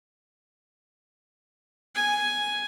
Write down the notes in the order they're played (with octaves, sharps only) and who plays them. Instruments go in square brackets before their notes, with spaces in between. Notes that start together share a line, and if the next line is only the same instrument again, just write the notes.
[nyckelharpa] G#5